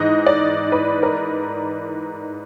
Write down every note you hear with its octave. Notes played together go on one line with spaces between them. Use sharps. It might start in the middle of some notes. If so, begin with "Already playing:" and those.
Already playing: G#2 E3 D#5
D5
B4
A#4